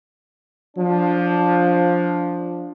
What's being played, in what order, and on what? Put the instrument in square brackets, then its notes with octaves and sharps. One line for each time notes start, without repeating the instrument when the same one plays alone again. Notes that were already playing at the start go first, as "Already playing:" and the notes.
[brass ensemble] F3 D4